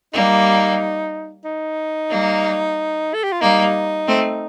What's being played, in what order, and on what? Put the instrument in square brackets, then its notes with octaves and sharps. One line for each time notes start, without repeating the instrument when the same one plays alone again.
[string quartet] G3 A#3 [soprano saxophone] D#4
[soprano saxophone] D#4
[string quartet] G3 A#3
[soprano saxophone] A4
G4
F4
[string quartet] G3 A#3 [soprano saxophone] D#4
[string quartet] A3 C4